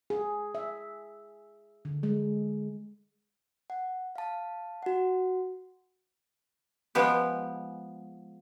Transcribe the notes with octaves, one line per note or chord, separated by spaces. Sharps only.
G#4
E5
D3
G#3
F#5
F5 A5
F#4 F#5
F3 G#3 B3 G4